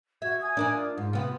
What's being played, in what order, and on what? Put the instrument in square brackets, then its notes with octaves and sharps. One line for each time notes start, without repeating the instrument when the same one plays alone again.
[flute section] F#4 G#6 [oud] E5
[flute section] G#5 D#6 G#6
[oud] D4 A#4 D5
[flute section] F4
[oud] G#2
C3 B3